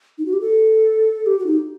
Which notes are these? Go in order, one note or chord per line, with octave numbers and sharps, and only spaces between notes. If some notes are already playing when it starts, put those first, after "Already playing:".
D#4
F#4
G4
A4
G4
F#4
D#4